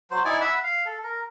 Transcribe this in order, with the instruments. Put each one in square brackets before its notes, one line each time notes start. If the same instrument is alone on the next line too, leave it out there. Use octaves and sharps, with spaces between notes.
[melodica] F#3 C5
D#4 E4 D5 G#5
E5 F#5 B5 E6
F5
A4
A#4